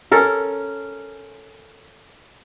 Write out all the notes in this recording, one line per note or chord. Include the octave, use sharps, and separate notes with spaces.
C#4 A4 A#4